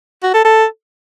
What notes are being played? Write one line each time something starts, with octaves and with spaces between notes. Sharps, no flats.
F#4
A4
A4